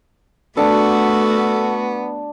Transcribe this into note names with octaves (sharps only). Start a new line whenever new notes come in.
A3 B3 D4 F#4 A4